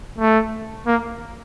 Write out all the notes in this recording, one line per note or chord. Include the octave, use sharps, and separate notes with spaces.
A3
A#3